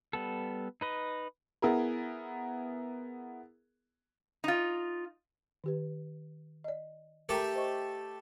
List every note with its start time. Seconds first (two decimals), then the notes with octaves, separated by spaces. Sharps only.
0.13 G3 B3 A4
0.81 D#4 B4 D#5
1.62 B3 E4 G#4 A#4
4.44 D#4 F4
5.64 D#3 G4 B4
6.64 D5 D#5
7.29 A3 G4 A4 A#4 A#5
7.55 C5 D#5 C#6